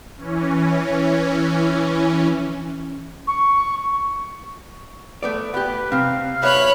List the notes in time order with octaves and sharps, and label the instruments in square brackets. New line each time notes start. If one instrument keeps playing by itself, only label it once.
[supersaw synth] E3 C#4
[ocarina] C#6
[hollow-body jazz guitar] A3 B3 D5
[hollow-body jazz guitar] B3 G4 [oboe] B4
[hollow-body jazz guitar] C3 C4 [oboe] F5
[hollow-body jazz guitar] B1 B2 E5 [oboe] B4 [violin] C#5 B5